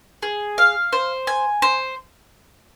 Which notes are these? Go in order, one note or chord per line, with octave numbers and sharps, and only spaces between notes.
G#4
F5
C5
G#5
C5